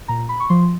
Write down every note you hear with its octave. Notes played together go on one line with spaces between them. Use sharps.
A#2 A#5
B5
C#6
F3 C6